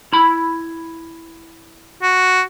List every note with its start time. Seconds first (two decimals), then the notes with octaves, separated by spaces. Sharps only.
0.13 E4 B5
2.02 F#4